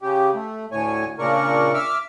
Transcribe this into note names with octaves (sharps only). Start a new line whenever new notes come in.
C#3 G4
A3
D2 A2 C#5 G#5
A#2 C#3 D4 A#4 C#6
E5 D6 E6 F6